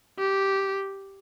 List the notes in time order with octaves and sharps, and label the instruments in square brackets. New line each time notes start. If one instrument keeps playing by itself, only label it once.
[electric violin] G4